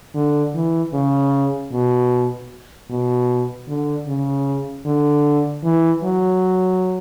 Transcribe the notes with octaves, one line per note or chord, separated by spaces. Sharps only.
D3
E3
C#3
B2
B2
D3
C#3
D3
E3
F#3